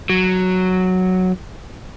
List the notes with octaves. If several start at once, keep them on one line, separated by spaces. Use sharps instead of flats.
F#3